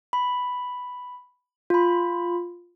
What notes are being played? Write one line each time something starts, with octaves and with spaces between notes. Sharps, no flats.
B5
F4 B5